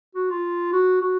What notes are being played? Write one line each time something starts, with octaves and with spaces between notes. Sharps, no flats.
F#4
F4
F#4
F#4